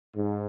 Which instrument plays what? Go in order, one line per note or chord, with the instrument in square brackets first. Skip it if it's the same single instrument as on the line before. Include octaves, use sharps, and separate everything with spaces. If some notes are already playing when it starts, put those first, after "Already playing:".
[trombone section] G#2